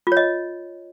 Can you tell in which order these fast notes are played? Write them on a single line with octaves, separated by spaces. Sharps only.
F4 C#5 D#5